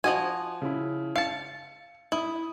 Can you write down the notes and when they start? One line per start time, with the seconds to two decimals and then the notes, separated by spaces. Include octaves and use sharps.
0.04 F3 F#4 D#5 G#5
0.62 C#3 E4
1.16 F5 A5 C#7
2.12 E4 D#6